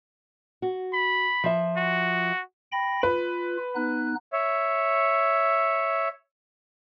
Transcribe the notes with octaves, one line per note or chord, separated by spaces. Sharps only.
F#4
B5
F3 E5
F#4
G5 B5 A#6
F4 B4
B3 D#4 F#6
C#5 E5